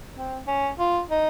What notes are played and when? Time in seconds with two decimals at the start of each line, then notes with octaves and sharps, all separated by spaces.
0.16 C4
0.47 C#4
0.78 F4
1.10 D#4